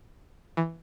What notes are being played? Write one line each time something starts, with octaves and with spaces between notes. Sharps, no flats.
E3